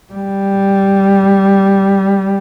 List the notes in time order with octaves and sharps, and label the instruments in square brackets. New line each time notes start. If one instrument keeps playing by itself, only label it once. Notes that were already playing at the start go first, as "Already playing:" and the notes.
[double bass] G3